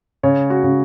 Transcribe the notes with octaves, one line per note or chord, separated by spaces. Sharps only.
C#3 C#5
F#4
C#3